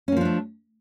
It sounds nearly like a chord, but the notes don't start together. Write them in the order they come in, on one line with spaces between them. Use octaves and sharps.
C#4 A#3 F3 D4 A3